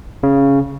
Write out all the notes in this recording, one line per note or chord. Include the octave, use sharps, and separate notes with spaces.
C#3